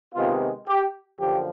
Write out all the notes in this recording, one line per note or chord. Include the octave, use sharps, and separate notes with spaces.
C3 D#3 G#3 B3 F4
G4
F#2 D3 F3 A#3 G4